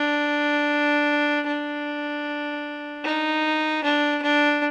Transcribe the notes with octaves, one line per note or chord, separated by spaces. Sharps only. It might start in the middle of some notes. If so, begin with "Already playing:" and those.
Already playing: D4
D4
D#4
D4
D4